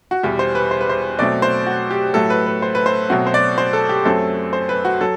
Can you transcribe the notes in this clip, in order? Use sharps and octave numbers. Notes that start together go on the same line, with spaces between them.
F#4
E2 B2 G3 G4
C5
B4
C5
B4
C5
B2 F#3 A3 C4 D5
C5
F#4
G4
A2 F#3 A3 A4
B4
B4
C5
B4
C5
B2 F#3 A3 C4 F#4
C5
D5
C5
A4
G4
F#2 F#3 A3 C4 A4
C5
B4
F#4
F#3 A4